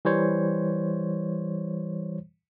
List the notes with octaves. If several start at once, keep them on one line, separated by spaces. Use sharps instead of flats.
E3 G3 C5 C#5